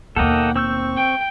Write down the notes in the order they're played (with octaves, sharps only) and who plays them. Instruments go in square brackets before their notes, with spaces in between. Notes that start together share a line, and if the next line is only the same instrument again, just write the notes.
[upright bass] D#2 B2 [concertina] A#3 F#5 G5 [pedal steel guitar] A4 A#4 D#5
[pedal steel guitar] C4 E6 G6 [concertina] C#6
[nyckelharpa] G5